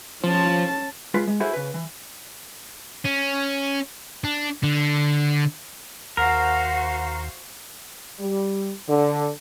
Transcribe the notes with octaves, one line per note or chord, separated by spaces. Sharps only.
F3 C#4 A5
G#3 F4 B4
G#3
E4 F#4 G#4 A4 C5
C#3 B4
E3
C#4
D4
D3
D#2 F#4 A#4 C5 F5 F#5
G3
D3